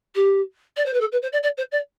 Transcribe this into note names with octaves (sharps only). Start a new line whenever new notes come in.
G4
D5
C5
B4
A4
B4
C5
D5
D5
C5
D5